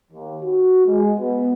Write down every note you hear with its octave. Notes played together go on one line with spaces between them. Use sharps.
D#2
F#4
G#3
B3